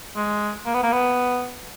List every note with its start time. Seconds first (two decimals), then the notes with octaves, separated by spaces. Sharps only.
0.16 G#3
0.66 A#3
0.74 B3
0.83 A#3
0.92 B3